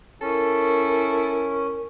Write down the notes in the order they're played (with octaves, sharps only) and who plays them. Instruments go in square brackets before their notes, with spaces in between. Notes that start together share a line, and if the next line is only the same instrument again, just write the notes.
[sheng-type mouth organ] C#4 [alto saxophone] E4 [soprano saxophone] A4 [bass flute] A#4